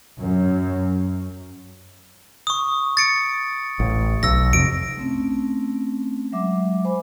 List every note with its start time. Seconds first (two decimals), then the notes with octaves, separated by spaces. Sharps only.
0.19 F#2
2.47 C#6 D#6
2.97 A6 C#7 D7
3.80 A1
4.23 B1 E6 A#6
4.53 F2 C3 D7
4.97 A3 C4 C#4
6.32 F#3 G#3 E5 D6
6.85 C5 G#5 B5